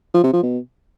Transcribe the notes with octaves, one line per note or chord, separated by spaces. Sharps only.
F3
C3
F3
B2